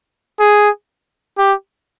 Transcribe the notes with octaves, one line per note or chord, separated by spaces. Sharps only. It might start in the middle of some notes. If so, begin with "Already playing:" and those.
G#4
G4